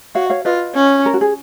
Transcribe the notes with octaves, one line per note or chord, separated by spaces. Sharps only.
F#4 C#5 F5
C#5 F5
F4 B4 D#5
C#4
A#4
F#4
G#4